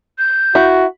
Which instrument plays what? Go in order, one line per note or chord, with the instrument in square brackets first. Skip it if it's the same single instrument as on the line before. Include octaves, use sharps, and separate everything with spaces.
[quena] G6
[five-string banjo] E4 [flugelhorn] F#4